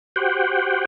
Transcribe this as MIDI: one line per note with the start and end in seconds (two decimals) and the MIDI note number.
0.16 0.85 66
0.16 0.85 67
0.16 0.85 72
0.16 0.85 78
0.16 0.85 79